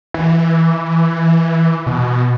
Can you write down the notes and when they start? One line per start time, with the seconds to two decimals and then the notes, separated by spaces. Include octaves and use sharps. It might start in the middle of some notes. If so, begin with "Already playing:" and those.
0.14 E3
1.86 B2